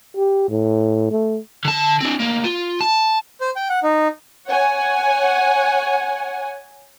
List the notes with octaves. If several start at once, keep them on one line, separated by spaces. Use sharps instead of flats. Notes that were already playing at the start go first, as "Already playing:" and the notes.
G4
A2
A3
D3 A5
C4 D4
D2 A#3
F4
A5
C5
G5
F#5
D#4
C#5 F#5 G#5